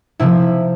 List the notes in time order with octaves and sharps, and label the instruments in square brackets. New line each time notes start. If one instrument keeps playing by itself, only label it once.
[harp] C3 F3 E4